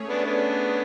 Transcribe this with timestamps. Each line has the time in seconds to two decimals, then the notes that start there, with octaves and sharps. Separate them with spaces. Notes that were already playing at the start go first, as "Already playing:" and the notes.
Already playing: A3 C#4 G#4 C#5
0.10 B3 D4
0.25 B3 D4